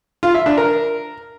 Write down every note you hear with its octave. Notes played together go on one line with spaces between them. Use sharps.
F4
E5
D4
A#4